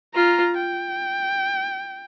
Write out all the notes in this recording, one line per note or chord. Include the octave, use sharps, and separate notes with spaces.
F4 A#5
G5